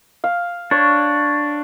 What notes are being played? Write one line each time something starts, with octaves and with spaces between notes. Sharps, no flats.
F5
D4 C#5